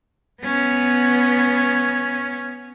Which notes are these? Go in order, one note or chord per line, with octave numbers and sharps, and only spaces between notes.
B3 C#4